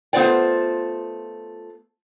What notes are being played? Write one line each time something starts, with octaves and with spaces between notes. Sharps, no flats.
A3 B3 F4 C5 D5 G5